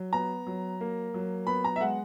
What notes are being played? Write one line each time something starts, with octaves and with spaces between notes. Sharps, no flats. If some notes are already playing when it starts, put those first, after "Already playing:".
Already playing: F#3
B3 A#5
F#3
A#3
F#3
B3 B5
A#5
E5
G#3 F#5